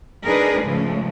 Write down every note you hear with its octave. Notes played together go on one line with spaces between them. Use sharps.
D4 D#4 G#4 A#4 B4
G#2 C#3 F3 G#3 A3